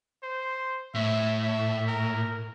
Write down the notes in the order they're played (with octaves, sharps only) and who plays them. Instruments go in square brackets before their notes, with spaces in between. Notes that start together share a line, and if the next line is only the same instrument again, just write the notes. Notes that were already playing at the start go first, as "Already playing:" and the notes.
[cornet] C5
[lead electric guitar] A2 [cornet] E5
[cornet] E5
A#4